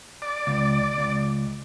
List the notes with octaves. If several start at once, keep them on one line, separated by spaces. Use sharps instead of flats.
D5
C#2
C#2